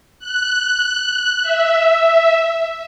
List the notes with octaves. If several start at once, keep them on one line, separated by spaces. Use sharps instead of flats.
F#6
E5